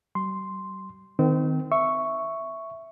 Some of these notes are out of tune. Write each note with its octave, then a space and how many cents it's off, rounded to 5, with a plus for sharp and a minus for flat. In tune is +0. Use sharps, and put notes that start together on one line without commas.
G3 -40 C6 +0
D#3 +0 C4 -30
E5 +0 C#6 +0